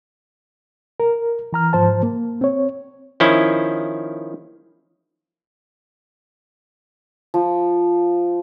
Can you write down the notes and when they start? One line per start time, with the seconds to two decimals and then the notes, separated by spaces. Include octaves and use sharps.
1.00 A#4
1.53 E3 A#5 F6
1.73 G#2 F3 C5 A5
2.03 A#3
2.41 C4 C#5
3.20 D#3 F3 C#4 E4
7.34 F3